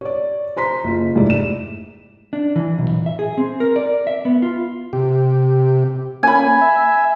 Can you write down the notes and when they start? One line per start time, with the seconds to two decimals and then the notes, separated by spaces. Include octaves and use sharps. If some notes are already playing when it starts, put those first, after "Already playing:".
0.01 C#5 D5
0.57 C5 A#5 C6 B6
0.84 F#1 F4
1.15 F1 G#2 E4 D5
1.30 E7
2.33 D4
2.56 E3
2.78 B1
2.90 A#2
3.06 E5
3.19 G#4
3.38 C4
3.60 A#4
3.76 D5
4.07 E5
4.25 B3
4.42 F4
4.93 C3 G4
6.23 A#3 C#4 G#5 B5
6.62 E5